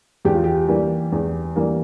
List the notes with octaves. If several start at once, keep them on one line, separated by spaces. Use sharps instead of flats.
E2 G4
F4
G4
E3 G3 A#3
E2
E3 G3 A#3